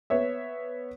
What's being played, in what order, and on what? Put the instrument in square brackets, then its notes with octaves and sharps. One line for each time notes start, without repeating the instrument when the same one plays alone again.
[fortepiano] B3 C#5 E5